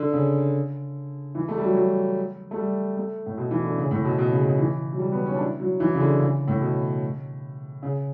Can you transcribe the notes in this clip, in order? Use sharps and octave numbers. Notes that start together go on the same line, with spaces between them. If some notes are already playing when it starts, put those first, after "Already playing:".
Already playing: D3
C#3
E3
A3
G3
F#3
F#3
A3
G3
A3
A2
B2
E3
D3
C#3
A2
B2
B2
C#3
B2
E3
F#3
G3
B3
C#4
D4
E4
F#3
E3
C#3
D3
C#3
A2
B2
C#3